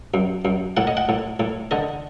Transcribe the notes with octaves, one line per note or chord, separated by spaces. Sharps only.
F#2
F#2
A2 F#5
D#5
F#5
A2
A2
D3 D#5